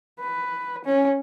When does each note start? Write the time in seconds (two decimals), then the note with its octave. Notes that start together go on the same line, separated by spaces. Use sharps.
0.20 B4
0.85 C#4